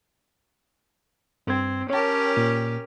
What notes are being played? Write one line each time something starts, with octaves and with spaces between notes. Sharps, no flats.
G2 C4 G#6
C#4 G4 A#4 C#5 A5
A#2